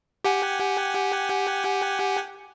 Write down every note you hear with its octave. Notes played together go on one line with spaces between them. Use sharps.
G4 F#5 G#5